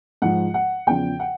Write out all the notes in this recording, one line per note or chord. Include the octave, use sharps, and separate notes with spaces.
G#2 F3 F#5
F#5
E2 C#3 F3 G5
F#5